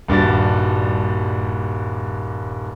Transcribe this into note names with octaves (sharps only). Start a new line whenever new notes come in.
D#1 G2 D4 F#4 A6